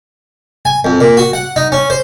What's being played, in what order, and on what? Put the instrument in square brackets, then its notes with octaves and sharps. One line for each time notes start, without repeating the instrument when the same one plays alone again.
[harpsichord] G#5
F2
A#2
F#4
F#5
D#4
C#4
C5